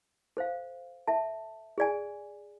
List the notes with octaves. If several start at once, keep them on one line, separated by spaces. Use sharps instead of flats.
A4 C5 F5
A4 E5 A5
G#4 D5 G#5